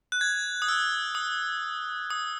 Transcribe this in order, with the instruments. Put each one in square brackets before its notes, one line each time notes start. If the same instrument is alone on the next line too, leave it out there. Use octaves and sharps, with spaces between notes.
[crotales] F#6
G#6
D#6
E6
D#6
D#6